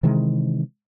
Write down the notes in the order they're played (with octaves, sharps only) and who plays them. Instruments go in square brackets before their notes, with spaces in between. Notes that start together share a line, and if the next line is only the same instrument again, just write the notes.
[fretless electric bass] C3 D#3 E3 G#3